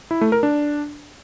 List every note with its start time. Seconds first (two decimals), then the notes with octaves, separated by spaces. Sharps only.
0.11 E4
0.21 A3
0.32 A#4
0.43 D4